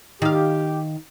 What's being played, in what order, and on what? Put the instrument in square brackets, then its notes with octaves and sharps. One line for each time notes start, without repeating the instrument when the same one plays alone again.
[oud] D#3 F5 [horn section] G4